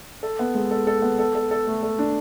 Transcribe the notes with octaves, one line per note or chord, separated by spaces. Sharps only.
A4
B3
G#3
A4
A4
B3
A4
A4
A4
A3
A4
D4